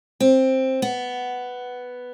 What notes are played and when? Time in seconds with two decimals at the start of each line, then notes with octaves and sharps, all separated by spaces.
0.20 C4
0.82 B3